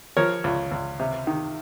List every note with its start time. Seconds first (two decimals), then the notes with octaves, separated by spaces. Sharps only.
0.17 F3 A#4 C#5
0.44 C#2
0.72 C#2
1.00 C3
1.27 D#3